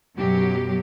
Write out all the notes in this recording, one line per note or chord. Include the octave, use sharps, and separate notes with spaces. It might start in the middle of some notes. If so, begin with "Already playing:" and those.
F#2 B2 F#3 G4